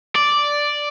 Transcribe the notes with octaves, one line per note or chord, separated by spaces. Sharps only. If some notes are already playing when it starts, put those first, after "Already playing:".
D5